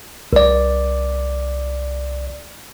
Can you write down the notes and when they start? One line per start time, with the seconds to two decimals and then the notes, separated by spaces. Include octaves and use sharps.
0.33 C2 D5